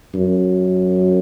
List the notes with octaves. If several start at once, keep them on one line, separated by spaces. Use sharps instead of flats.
F#2